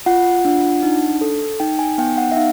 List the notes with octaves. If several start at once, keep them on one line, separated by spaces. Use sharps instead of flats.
F4 F#5
D4
D#4
A4
D#4 G5
G#5
B3 G5
F#5
E5
D#4 F5